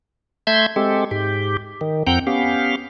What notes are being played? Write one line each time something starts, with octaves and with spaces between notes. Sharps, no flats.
A3 E5 C6 G6 G#6
G#3 C4 G4 A4
G#2 G4
D#3
F2 C4 F#5 G5 A#5 G6
B3 C#4 G4 F5